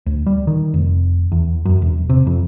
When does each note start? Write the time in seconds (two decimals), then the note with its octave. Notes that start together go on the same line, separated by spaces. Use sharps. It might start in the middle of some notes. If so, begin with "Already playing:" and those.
0.06 D2
0.27 G3
0.47 D#3
0.74 F1
1.32 E2
1.65 F#2
1.82 E1
2.10 C3
2.27 F2